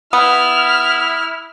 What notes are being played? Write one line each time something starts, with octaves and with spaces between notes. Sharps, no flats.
B3 E4 D#6 F6